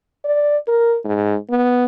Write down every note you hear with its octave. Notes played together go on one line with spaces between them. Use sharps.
D5
A#4
G#2
B3